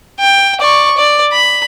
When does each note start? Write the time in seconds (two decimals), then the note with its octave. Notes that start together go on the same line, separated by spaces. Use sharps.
0.19 G5
0.61 D5 C#6
0.97 D5
1.32 B5